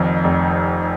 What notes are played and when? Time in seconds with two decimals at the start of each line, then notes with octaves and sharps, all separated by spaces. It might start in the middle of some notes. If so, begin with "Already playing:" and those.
Already playing: F1 F2 D#3
0.24 F1